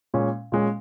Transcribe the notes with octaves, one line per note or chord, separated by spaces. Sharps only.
A#2 G#3 C#4
A#2 G#3 C#4